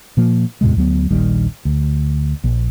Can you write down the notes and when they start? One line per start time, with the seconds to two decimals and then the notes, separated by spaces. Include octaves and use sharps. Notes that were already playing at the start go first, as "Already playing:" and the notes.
0.17 A#2 F3 A#3
0.61 E2 A2 C3 G#3
0.76 D2 F#3 B3
1.11 D#1 A#1 D#3 G3
1.65 D2
2.44 A#1